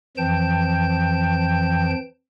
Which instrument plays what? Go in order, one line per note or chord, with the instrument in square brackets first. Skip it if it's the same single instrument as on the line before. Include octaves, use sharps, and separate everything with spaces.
[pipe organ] F2 E3 F3 G5 A5 G6